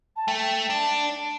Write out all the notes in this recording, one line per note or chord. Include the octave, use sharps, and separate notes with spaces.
A5
A3 G5
D4 A5